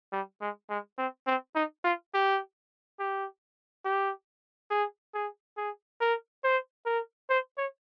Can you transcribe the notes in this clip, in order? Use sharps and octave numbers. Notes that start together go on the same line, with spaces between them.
G3
G#3
G#3
C4
C4
D#4
F4
G4
G4
G4
G#4
G#4
G#4
A#4
C5
A#4
C5
C#5